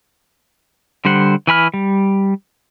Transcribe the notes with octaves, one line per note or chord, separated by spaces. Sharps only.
D3 G3 C5 F#5
E3 G#5 B5 F6
G3